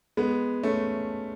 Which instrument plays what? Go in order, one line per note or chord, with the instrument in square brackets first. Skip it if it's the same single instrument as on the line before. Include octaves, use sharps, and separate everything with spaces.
[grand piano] G#3 B3
A3 C#4